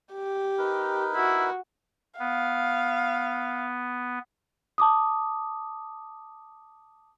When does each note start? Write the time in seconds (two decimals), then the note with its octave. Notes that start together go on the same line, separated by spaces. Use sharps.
0.13 G4
0.58 D#4 A#4 B4
1.15 E4 F#4
2.19 B3 F5
4.78 A5 D6 D#6